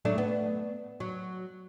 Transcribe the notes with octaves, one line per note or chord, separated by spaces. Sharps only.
F#3 A3 D4
B3
F#3